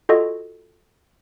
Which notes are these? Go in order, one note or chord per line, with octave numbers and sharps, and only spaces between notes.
F4 F#4 A4 D#5